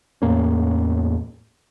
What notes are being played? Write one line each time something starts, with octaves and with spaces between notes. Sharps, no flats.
E2 A2 A#3 C#4